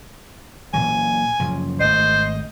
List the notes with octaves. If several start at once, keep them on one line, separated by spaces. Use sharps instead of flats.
A#2 E3 F#3 G#5
F#2 C#3 F3
G#1 A3 C5 D#5